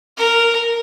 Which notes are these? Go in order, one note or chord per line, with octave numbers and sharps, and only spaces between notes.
A#4